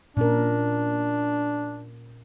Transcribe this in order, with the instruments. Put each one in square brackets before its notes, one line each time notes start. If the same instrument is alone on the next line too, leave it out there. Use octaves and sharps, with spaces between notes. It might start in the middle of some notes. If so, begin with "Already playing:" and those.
[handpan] A#2 C#4 A#4 [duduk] D4